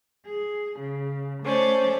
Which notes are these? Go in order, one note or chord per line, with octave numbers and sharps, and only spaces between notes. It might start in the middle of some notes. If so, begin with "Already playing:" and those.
G#4
C#3
A3 C#4 C5 D5